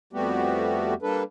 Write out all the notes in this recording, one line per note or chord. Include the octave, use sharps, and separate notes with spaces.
F2 G3 A3 B3 F#4 G4
G3 A#3 D4 A4 B4